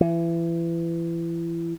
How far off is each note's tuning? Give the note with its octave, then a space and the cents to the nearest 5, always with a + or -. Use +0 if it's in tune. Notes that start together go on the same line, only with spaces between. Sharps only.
E3 +30